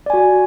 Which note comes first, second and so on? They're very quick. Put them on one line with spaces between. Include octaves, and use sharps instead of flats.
D5 G#5 F#4